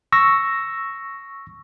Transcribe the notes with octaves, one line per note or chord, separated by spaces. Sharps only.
C#6 E6 A#6